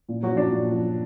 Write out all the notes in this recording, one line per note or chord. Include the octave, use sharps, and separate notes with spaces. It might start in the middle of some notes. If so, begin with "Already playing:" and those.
A#2
F#3 F#4
F3
D4
A#2
F3